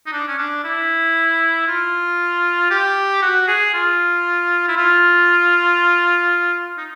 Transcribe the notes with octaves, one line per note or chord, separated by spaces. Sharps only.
D#4
D4
C#4
D4
E4
F4
G4
F#4
G#4
F4
E4
F4
D#4